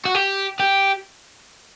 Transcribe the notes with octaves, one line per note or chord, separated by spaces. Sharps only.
F#4
G4
G4